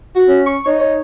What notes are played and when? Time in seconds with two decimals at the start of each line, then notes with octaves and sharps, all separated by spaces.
0.16 F#4
0.28 C#4
0.46 C#6
0.66 D#4 C#5
0.80 C#5